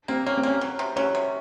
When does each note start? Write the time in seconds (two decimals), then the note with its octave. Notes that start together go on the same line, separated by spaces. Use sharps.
0.08 A#3 C4
0.26 A#3 C#4
0.37 C4
0.43 A#3 C#4
0.61 F#3
0.79 C3
0.96 F#3 C#4
1.15 C3